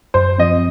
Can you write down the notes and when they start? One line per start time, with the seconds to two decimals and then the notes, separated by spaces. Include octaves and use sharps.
0.14 F#2 C5
0.39 F3 C4 D#5